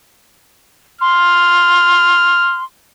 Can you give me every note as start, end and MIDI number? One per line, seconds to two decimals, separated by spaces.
1.01 2.64 84
1.01 2.61 89